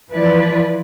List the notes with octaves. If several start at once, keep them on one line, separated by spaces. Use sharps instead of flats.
E3 F3 E4 B4 D5